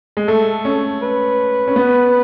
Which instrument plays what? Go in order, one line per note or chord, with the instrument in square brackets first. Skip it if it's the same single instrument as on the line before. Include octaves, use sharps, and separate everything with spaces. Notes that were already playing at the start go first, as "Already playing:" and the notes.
[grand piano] G#3
[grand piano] A3 [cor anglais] A4
[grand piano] C#4
[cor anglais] B4
[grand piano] C#4
B3